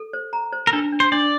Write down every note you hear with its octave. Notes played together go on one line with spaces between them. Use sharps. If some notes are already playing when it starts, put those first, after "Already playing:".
Already playing: A4
C5
A#5
C5
A#4
D4 A4
D4
C5
D4 D5